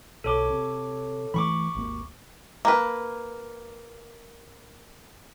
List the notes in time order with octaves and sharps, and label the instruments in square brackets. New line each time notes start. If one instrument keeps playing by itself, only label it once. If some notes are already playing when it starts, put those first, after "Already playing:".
[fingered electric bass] B1 [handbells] A4 C#5 D6
[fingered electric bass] C3
[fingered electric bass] E3 A3 [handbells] B5 C#6 D6
[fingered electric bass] G#1 D#2 A#3
[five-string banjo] A#3 B4